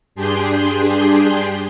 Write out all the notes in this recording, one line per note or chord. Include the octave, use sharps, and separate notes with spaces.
G2 D4 G4 G#4 C6 G6